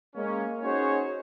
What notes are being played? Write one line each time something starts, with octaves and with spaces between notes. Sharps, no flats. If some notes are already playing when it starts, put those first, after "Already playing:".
G#3 A#3 C#4
C#4 D#4 F#4 G#4 C5 C#5